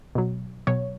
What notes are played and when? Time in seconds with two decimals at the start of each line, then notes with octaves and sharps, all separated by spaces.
0.15 B2 F#3
0.67 B2 F#3 C#5